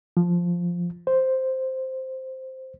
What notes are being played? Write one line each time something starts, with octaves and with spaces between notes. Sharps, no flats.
F3
C5